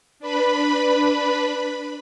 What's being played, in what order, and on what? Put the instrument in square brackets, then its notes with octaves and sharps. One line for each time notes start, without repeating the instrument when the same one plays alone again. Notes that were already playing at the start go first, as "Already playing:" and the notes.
[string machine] D4 B4 B5